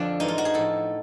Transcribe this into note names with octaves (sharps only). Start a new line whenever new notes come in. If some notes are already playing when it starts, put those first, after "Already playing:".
Already playing: F2 D3 F3 D4
G#2 E3 D#4
F4
F#4
G#4
A2 F3 A4